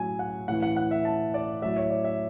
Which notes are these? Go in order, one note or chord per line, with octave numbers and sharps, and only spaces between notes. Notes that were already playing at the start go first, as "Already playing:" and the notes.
Already playing: A2 F#3 G#5
F#5
A2 E3 F#5
F#5
F#5
E5
A5
D5
A2 F#3 E5
C#5
D5
E5